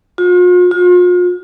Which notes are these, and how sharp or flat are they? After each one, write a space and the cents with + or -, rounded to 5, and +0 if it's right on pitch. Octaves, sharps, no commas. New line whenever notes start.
F4 +45
F4 +40